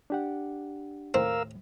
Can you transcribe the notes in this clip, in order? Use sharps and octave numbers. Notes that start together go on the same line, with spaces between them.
D4 G4 F#5
D#2 A2 C4 A#4 F5 E6